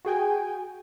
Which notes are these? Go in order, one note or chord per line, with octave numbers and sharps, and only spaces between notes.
F#4 G#4 G5 G#5